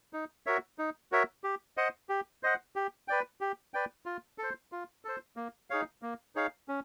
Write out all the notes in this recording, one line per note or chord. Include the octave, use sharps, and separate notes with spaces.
D#4
F#4 A#4 C#5 E5
D#4
F#4 A#4 C#5 E5
G4
C5 D#5 F#5
G4
C5 D#5 F#5
G4
B4 D5 G5
G4
B4 D5 G5
F4
A4
C5
F4
A4 C5
A#3
D#4 G#4 C#5 F5
A#3
D#4 G#4 C#5 F5
C#4